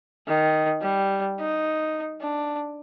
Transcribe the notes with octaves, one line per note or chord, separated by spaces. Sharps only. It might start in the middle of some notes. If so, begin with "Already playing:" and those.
D#3
G3
D#4
D4